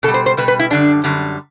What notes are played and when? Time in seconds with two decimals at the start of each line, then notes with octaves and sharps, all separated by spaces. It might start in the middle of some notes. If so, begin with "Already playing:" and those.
0.03 B2 A4
0.08 G3
0.14 C5
0.26 C5
0.37 B2 G3 B4
0.48 B4
0.59 E4
0.70 F#2 D3 G3 D4
1.04 F#2 D3 G3